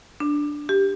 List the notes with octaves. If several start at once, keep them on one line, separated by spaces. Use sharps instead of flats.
D4
G4